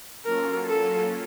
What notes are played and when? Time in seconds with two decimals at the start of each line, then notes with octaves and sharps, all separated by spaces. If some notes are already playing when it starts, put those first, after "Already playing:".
0.25 F#3 A#3 C#4 F4 A4 A#4
0.68 A4